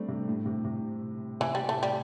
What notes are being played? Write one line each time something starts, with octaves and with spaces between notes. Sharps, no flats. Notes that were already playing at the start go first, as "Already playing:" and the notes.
Already playing: G3 A3 C4 D4
C3
A2
C3
C3
C3 E3
G3
A2 A3
G3